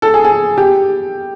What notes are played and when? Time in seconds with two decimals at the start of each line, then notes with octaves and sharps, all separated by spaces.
0.02 A4
0.14 G#4
0.25 G#4
0.58 G4